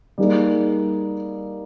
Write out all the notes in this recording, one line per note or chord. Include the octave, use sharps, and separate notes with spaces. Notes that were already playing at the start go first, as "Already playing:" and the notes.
G3 A#3 D#4 G#4